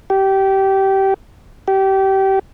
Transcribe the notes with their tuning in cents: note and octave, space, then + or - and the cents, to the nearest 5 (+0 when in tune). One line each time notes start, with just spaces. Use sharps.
G4 -20
G4 -25